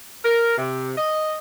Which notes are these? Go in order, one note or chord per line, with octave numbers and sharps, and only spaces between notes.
A#4
C3
D#5